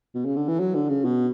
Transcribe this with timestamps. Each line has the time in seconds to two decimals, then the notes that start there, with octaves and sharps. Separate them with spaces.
0.14 B2
0.25 C#3
0.36 D3
0.48 E3
0.60 F#3
0.75 D3
0.89 C#3
1.05 B2